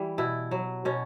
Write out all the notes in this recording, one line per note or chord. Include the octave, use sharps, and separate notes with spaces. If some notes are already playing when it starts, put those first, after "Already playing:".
Already playing: E3 G3
B2 E4
F#3
B2 C#4